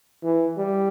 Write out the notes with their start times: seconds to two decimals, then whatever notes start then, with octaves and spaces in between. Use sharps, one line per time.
0.23 E3
0.57 G3